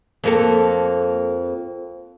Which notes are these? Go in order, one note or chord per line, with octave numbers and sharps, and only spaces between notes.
F2 A#3 A4